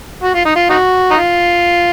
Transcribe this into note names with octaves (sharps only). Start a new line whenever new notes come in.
F#4
F4
D#4
F4
D#4 F#4
D#4
F4